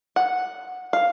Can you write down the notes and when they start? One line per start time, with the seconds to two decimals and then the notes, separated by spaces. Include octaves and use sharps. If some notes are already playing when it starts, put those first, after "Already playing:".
0.16 F#5
0.93 F5